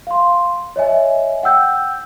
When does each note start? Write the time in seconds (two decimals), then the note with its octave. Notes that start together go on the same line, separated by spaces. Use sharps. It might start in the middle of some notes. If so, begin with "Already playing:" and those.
0.07 F5 C6
0.76 C#5 D#5 E5 G#5
1.43 F#5 G5 E6 G6